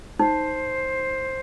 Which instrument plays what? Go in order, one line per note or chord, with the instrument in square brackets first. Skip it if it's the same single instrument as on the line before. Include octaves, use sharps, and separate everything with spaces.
[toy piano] D#4 [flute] C5